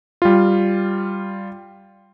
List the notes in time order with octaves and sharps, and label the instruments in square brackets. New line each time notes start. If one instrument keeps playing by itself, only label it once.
[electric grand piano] G3 F4